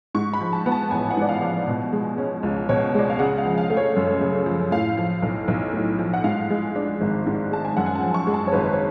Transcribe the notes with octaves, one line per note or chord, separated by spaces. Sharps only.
G#2 C#6
B5
F3
A5
B3
A5
A1 G#5
F#5
G#2 D5
F5
F3
B2
G#3
C#4
C#2
B2 C#5
G#3 D5
F5
C#3 F#5
F5
F3
F5
A3
C#5
F#2
C#3
F3
A2 F5
F3
B1
B1
A2
F3
F#5
G#2 F5
G#3
D4
G#1
G#2
G#3 A5
G#5
F#2 F#5
G#5
A5
F3
C#6
G#3
A5
C#5
G#1 B4
C#5